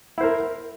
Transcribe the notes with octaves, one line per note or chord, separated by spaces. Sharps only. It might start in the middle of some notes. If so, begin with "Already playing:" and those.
E4 A#4 C5